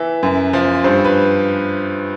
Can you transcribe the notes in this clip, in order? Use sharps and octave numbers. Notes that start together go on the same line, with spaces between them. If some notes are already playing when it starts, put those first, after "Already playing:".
Already playing: E3 E5
F#2
F3
G2 C5
B4